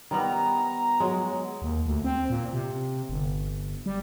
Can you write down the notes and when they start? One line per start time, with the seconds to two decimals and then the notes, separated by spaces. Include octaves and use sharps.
0.11 D#3 G3 B3 A#5
1.00 F#3 G#3
1.62 D#2
1.86 D2
2.04 C4
2.30 A#2
2.53 C3
3.09 G1
3.86 G3